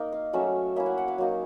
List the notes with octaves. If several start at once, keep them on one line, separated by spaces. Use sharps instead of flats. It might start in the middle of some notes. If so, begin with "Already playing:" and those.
Already playing: A#3 D#4
F5
F#3 A3 C#4 E5
A#3 C#4 E4 E5
F#5
F#5
F5
F#3 A#3 D#4